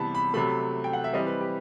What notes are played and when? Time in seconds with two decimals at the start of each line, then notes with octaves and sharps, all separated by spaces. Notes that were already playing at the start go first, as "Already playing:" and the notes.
Already playing: C3 E3 G3 B3 A5 B5
0.15 B5
0.34 C3 F#3 A3 B5
0.84 G5
0.93 F#5
1.04 E5
1.13 E3 G3 C4 D#5
1.26 B4
1.41 G4